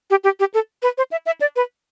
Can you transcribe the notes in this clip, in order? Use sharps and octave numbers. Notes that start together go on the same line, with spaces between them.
G4
G4
G4
A4
B4
C5
E5
E5
D5
B4